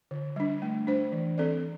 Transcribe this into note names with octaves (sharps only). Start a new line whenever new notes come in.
D3
G3 D4
A3
D4 C5
E3
C4 A4 D5